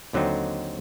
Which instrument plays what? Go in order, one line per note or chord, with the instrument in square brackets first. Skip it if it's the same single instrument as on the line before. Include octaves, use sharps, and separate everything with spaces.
[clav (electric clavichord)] D#2 D3 F#3 C4 D#4